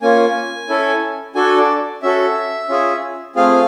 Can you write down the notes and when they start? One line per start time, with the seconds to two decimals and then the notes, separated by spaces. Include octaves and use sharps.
0.02 A#3 C#4 F4 G#5
0.69 C#4 E4 A4
1.35 D4 F#4 A4 G#5
1.58 D5
2.02 C#4 F#4 A4 E5
2.69 C#4 F4 G#4
3.36 A3 C4 F4 G#4 F5